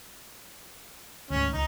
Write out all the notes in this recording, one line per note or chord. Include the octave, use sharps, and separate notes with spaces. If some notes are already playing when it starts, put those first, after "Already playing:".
D2 G#2 C#4
C#2 D#4